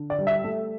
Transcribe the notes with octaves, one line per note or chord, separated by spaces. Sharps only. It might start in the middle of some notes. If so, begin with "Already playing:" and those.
Already playing: D3
D5
G3
E5
A3